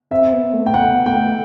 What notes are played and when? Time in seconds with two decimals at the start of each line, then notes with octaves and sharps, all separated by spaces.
0.11 C4 E5
0.33 B3
0.53 A3
0.66 G5
0.74 B3 F#5
1.06 A3 G5